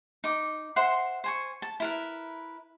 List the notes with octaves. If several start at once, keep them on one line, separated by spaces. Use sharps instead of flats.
D#4 D6
C5 E5 F#5 C6
C5 G#5 C#6
A5
E4 A#4 B4